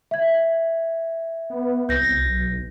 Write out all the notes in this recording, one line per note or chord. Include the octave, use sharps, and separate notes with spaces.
E5 G#6
B3
C2 G6 A#6
B1